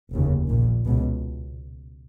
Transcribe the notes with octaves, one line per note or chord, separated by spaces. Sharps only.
F1 D#2 C#3
A#1 A#2
C#2 B2